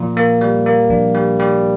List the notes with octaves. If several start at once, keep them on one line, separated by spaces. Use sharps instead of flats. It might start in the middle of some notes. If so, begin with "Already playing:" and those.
Already playing: A#2 F3
A#3
G3
A#3
F3 D4
G3
G3